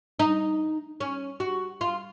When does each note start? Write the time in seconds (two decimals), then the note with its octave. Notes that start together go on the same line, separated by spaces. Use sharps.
0.19 D#4
1.00 C#4
1.40 F#4
1.81 F4